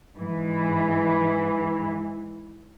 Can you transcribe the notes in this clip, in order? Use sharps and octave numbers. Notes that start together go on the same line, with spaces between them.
G#2 E3